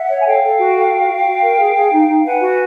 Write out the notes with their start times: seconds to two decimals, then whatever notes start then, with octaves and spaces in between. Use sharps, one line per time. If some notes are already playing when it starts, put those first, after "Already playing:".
Already playing: E5 F#5
0.09 C#5
0.20 G#5
0.26 A4 F5 G5
0.43 A4
0.60 F#4
0.76 A4
0.93 F#4
1.09 F#4
1.26 F#4
1.42 A#4
1.59 G#4
1.76 G#4
1.92 D#4
2.09 D#4
2.25 B4 F#5 G#5
2.41 F#4